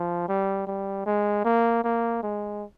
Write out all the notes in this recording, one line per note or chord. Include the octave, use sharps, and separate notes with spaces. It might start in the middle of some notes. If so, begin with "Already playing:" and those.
Already playing: F3
G3
G3
G#3
A#3
A#3
G#3